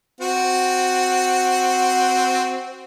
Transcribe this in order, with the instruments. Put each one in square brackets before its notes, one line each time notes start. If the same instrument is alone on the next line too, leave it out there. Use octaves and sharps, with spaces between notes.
[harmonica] C4 F#4 F#5